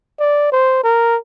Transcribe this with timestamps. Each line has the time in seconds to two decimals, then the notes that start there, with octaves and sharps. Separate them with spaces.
0.20 D5
0.52 C5
0.84 A#4